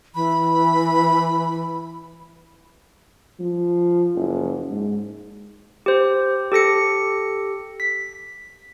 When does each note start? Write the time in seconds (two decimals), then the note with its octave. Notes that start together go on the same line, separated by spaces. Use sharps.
0.15 E3 B5
3.40 F3
4.15 F#1
4.70 G#2
5.86 G4 C5
6.52 G4 A4 A#6 C#7
7.80 B6